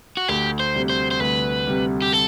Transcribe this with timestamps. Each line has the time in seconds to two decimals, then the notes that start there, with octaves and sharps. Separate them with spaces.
0.17 F#4
0.28 D2 G4
0.60 C5
0.75 C3 G3
0.89 C5
1.11 C5
1.20 D2 B4
1.67 C3 G3
2.02 G4
2.13 A4